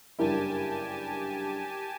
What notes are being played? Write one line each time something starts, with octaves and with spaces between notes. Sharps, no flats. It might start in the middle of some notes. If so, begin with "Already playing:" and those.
F#1 G2 E4 G4 A#4 G#5 A5